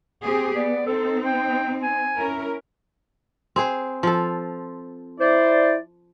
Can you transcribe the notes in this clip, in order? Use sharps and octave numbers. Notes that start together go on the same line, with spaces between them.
C4 G4 G#4
B3 D5
C4 D#4 A4
G5
G#5
C#4 E4 A#4
C4 G#4 C5
F3 A4
E4 C5 D5